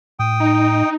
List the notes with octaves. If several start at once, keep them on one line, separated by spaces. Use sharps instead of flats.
A2 G5 D#6
D#4